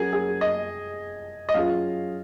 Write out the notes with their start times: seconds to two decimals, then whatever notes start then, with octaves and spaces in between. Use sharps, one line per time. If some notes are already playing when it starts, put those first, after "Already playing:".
Already playing: F#3 C#4 F#4 G#4 A#4
0.13 G#4
0.41 D#5
1.49 D#5
1.54 F#3 C#4 F4 G#4 F5